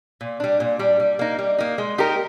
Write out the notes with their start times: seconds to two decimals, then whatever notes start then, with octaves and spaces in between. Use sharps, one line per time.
0.21 A#2
0.40 G3 D4
0.60 A#2
0.79 G3 D4
1.00 G3
1.19 A#3 D#4
1.39 G3
1.58 A#3 D#4
1.78 G#3
1.98 D#4 G4 A#4